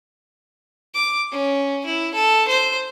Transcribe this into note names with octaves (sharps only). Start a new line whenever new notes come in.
D6
C#4
E4
A4
C5